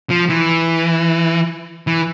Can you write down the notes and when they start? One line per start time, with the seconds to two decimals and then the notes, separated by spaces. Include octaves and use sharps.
0.10 F3
0.30 E3
1.87 E3